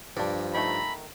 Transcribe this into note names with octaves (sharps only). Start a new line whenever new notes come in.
G2 F3 D4 D5
D#3 A3 A4 A#5 B5